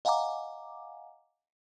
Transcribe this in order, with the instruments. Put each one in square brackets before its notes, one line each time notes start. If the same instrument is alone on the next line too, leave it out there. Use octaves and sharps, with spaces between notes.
[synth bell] D#5 F5 F#5 G#5 A#5 D6